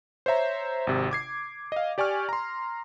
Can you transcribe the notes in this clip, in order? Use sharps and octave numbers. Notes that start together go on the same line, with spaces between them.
C5 C#5 E5 A#5
G#1 C3
D6 G#6 C7
D#5 F5
G4 D5 G#5 C#6 F6
A#5 C6